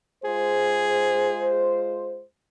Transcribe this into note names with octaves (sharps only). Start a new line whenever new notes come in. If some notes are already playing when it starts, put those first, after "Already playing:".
G#3 F4 G#4 C5